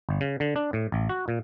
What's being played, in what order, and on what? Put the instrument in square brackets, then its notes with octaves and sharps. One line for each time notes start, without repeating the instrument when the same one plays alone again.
[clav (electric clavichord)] G1
C#3
D3
D4
A2
A1
F#4
A#2